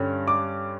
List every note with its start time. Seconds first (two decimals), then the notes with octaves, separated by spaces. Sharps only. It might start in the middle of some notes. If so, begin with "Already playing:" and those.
Already playing: G2 D3 G3 C#4
0.28 D6